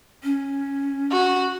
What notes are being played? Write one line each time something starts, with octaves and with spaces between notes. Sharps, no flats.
C#4
F#4